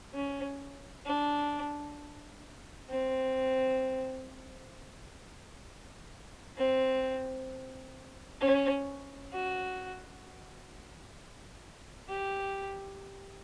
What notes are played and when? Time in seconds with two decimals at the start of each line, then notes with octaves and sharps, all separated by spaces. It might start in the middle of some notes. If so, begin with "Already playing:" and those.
0.14 C#4
1.06 D4
2.90 C4
6.57 C4
8.41 C#4
9.33 F#4
12.09 G4